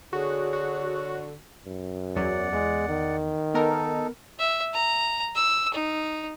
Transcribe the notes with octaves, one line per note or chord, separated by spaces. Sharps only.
D3 F#4 G#4 C#5
F#4
F#2
E2 F#3 C#4 D5 F#5
E2 G#3
D#3
B3 D#4 A4 A#4
E5
A#5
E6
D#4